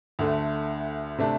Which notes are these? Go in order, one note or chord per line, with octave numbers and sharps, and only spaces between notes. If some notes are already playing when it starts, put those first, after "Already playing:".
D2 D3 A3
C3 A3 D4